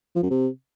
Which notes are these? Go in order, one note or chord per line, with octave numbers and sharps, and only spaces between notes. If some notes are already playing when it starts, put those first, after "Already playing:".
F3
F#2
C3